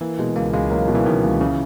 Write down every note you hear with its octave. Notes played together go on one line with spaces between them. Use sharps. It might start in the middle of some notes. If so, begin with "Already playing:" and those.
E3 A#3
B2 G#3
C#2 A#3
C#2 G#3
F#3 A#3
B2
E3
C#2 D#3
C#2
C#3 E3